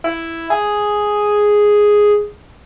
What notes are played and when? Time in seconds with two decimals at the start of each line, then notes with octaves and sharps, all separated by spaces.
0.04 E4
0.50 G#4